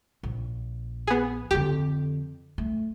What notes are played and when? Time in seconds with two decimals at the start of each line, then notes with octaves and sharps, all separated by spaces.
0.23 A#1
1.07 B3 G#4
1.51 F2 D3 G4
2.58 A3